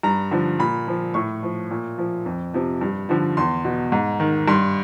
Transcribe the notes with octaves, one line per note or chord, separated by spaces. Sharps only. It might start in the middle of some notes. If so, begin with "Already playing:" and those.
G2 A#5
D3 F3
A#2 B5
F3
A2 C#6
F3
A#2
F3
F2
C3 F3
G2
D3 F3
E2 C6
B2
G#2
D#3
G2 C6